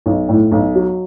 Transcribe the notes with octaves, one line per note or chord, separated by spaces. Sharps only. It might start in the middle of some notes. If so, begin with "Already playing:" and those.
B1
A2
B1
F#3